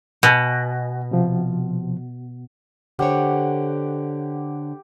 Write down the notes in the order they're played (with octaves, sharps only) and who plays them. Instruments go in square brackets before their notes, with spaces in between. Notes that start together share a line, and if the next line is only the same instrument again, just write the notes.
[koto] B2 [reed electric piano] D#5 G#5
[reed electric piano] C3 F3
[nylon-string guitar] D3 C5 C#5 [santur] G4 F#5